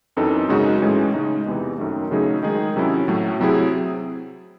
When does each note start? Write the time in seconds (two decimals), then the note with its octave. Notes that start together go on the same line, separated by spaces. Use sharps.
0.17 F#2 E3 C4 D#4 A4
0.49 F#2 C#3 G#3 D#4 F#4
0.82 A2 E3 G#3 C#4 G#4
1.14 C#3 G#3 D#4
1.46 E2 C3 E3
1.78 F#2 D#3 A3
2.11 C#3 F#3 A3 D#4 G#4
2.43 D#3 G#3 D#4 G#4
2.76 C3 F#3 C#4 E4
3.08 A2 F#3 A3
3.40 C3 F#3 C4 E4 G#4